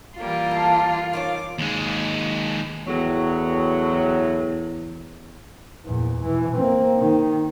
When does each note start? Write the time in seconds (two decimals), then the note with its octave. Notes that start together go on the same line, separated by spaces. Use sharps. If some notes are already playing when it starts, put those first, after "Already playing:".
0.19 E3 G3 A#3 F4
0.51 A4
1.13 D#3 C4 C#4 D6
1.58 D#2 G#3
2.87 E2 A2 F#3
5.85 E2 A#2
6.25 B2 E3
6.57 A#3 C4
6.98 D#3